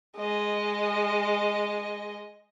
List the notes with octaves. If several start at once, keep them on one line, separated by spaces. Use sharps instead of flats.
G#3 D#5